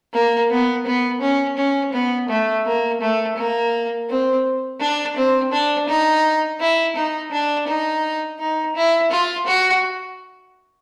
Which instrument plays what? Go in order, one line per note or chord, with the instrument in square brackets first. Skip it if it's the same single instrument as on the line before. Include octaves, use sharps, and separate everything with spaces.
[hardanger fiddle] A#3
B3
B3
C#4
C#4
B3
A3
A#3
A3
A#3
C4
D4
C4
D4
D#4
E4
D#4
D4
D#4
D#4
E4
F4
F#4